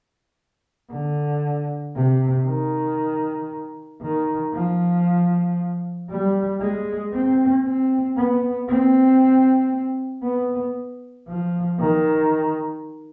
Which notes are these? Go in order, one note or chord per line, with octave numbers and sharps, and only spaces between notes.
D3
C3
D#3
D#3
F3
G3
G#3
C4
C4
B3
C4
B3
F3
D#3